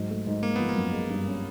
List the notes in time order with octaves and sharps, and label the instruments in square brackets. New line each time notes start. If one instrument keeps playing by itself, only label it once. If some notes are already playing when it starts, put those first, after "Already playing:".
Already playing: [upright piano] G#2 F#3
A3
G#2
[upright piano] G#3 [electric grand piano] A#3
[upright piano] F3 [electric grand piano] B3
[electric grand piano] A#3
[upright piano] F#2
G#3
G2
C#4